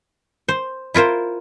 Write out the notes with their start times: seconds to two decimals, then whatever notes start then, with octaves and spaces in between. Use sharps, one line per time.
0.49 C5
0.94 E4 F4 A#4 C5